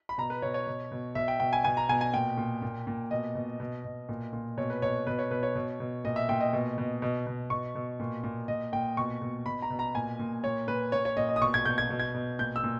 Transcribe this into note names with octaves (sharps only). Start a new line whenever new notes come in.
B5
B2 A#5
B4
B2 C#5
C#5
B2
B2
B2 E5
G5
B2 G5
G#5
B2 G#5
A#5
B2 G#5
G#5
A#2 G5
A#2
A#2
A#2
B2 D#5
B2
B2
B2
A#2
A#2
B2 C#5
B4
B2 C#5
B2 B4
C#5
B2 B4
C#5
B2
B2
A#2 D#5
E5
A#2 G5
D#5
B2
B2
B2
B2
B2 C#6
B2
A#2
A#2
A#2 D#5
A#2 G5
B2 C#6
B2
B2 B5
A#5
B2
A#5
A#2 G#5
A#2
A#2 C#5
A#2 B4
A#2 C#5
C#5
A#2 D#5
D#5
D#6
B2 C#6
G#6
B2 G6
G#6
B2
G#6
B2
A#2 G6
E6
A#2